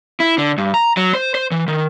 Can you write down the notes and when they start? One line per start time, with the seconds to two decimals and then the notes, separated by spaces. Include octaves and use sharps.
0.20 E4
0.38 D3
0.58 G2
0.74 A#5
0.97 F#3
1.15 C5
1.35 C5
1.51 E3
1.68 D#3